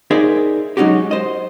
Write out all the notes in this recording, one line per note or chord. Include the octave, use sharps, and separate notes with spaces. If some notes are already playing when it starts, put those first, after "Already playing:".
D#4 G#4 A#4 C5 D5 E5
F#3 G#3 C#4 D#4 F#4 G4
C5 D#5